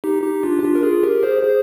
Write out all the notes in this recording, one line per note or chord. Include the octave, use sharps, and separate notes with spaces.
D#4 G4
D#4 G4
D4 F4
G4
D4 F4
A#4
F4 G#4
G4 A#4
G#4 C5
G#4 C5